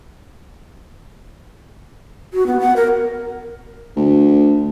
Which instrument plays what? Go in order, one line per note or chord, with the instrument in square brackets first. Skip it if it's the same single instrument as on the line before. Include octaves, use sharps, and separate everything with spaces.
[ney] F#4
B3
F#5
A#4
[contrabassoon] D2